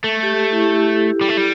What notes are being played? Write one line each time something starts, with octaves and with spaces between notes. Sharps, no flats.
A3 A4
G4
E4
G4
G3
A3
G3